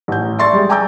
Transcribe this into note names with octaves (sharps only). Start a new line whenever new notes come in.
A1 G6
D5 E5 C6 C#6 A6
G3 G#3
G5 G#5 A#5 D6 E6 G6